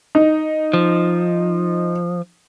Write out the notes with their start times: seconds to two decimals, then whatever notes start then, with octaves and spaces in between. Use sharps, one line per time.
0.15 D#4
0.73 F3